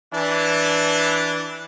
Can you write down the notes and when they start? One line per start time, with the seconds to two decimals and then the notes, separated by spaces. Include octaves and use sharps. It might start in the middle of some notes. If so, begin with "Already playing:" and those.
0.13 E3 D4